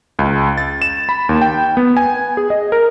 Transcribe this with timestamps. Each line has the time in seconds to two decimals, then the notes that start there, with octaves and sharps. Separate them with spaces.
0.19 C#2
0.58 A6
0.82 E7
1.09 B5
1.29 D#2
1.42 G5
1.77 B3
1.97 G#5
2.37 G#4
2.50 D#5
2.72 A#4